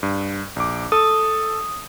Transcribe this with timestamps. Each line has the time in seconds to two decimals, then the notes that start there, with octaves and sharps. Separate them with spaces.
0.03 G2
0.56 A#1 D6
0.92 A4 D#6